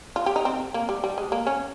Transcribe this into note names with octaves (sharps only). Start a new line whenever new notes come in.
F4
G4
D#4
C4
A#3
G3
G3
G#3
A#3
C#4